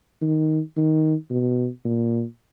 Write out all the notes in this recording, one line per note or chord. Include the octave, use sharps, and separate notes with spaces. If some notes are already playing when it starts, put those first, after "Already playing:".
D#3
D#3
B2
A#2